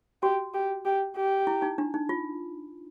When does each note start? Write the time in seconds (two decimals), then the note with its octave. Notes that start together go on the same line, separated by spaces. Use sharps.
0.22 F#4 G4
0.54 G4
0.85 G4
1.17 G4
1.47 E4
1.62 D#4
1.78 D4
1.94 D#4
2.09 F4